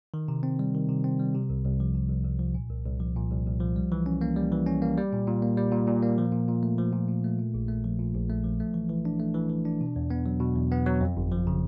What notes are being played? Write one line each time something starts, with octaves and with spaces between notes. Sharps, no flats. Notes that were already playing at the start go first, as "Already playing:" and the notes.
D#3
C3
C4
G3
D#3
C3
C4
G3
C3
C2
C2
F3
C3
C2
C2
F3
A#2
C2
C2
F3
A#2
C2
C2
F3
G3
E3
C#4
A#3
G3
E3
C#4
A#3
G3
A#2
A#2
A#3
G3
A#2
A#2
A#3
F3
A#2
A#2
A3
F3
A#2
A#2
A3
A#2
A#1
A3
F3
A#2
A#1
A3
F3
A3
E3
E3
D4
A3
E3
E3
D4
B2
E2
B3
F#3
B2
E2
B3
F#3
F2
G1
F3
C#3